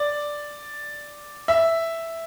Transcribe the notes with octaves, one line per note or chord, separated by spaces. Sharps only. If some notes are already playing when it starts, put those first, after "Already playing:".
Already playing: D5
E5